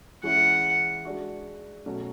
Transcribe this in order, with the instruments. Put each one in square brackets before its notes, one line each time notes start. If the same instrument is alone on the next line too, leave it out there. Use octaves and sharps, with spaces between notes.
[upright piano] E3 G#3 C#4 E4 [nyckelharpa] F#5
[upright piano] G#3 D4 F#4
B2 F#3 A3 C#4 F#4